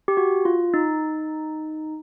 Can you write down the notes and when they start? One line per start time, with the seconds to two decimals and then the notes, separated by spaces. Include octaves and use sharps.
0.08 G4
0.17 F#4
0.45 F4
0.74 D#4